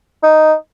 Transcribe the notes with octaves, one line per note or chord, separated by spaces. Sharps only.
D#4